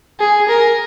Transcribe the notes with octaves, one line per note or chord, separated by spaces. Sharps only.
G#4
A#4